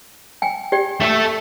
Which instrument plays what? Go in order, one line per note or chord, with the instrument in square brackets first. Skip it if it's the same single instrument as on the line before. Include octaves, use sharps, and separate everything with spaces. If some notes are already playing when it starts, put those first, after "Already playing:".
[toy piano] G5 G#5
G4 D5 G5
[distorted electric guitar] A3 A4